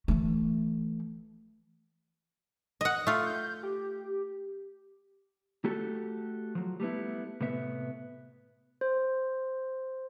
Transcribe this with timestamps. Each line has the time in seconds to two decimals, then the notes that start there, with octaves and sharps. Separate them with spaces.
0.08 E3 A3
2.81 D#5 F#5
3.07 A3 F4
3.26 G6
3.63 G4
5.65 A3 F#4 G4 A4
6.55 F3 F#3
6.80 G3 A3 B3 E4
7.41 A2 C3 B3 E5
8.81 C5